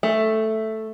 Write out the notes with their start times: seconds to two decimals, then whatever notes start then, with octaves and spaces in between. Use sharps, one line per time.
0.03 A3